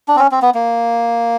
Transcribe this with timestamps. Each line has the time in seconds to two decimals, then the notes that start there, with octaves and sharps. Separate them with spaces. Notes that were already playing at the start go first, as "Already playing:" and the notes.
0.08 D4
0.16 C4
0.19 C#4
0.32 C4
0.42 B3
0.55 A#3